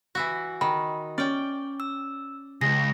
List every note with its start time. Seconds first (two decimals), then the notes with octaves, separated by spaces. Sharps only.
0.15 E3 E4 F#4
0.61 D#3 B5
1.18 C#4 D5 G5
1.80 E6
2.61 C#2 G#4 A#6